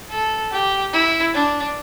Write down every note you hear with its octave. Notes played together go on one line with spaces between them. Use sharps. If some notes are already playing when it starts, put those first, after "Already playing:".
A4
G4
E4
D4